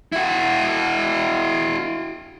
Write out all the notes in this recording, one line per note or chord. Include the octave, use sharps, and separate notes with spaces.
E4 F#4